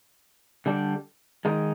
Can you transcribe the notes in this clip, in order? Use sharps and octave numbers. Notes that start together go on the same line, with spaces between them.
D3 G3 D4
D#3 G#3 D#4